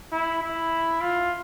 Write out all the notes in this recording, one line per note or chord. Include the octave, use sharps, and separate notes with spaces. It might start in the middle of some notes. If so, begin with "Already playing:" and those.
E4
E4
F4